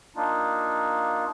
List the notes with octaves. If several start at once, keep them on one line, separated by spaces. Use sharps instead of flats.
A#3 D4 D#4 F4